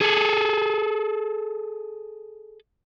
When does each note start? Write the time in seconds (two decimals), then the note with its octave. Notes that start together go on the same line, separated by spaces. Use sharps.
0.01 G#4 A4